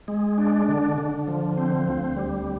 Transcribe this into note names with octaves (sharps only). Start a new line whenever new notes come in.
G#3
D4
D3
D3
F3
C4
D2
G3